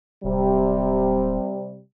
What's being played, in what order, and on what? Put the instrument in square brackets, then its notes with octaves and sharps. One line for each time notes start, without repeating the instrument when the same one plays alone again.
[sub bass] D1 [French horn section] C3 G3